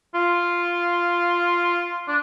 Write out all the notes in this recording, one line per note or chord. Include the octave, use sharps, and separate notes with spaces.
F4
D4